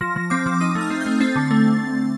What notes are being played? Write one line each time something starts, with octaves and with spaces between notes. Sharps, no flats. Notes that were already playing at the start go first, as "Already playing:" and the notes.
F3 A#6
F3
C4 D6
F3
D#4 D#6
A3
F6
C4
A3 G6
C4 A6
D3
A3